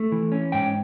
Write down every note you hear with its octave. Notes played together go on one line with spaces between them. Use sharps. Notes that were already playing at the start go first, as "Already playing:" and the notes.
Already playing: A3
E3
C#4
G#2 G5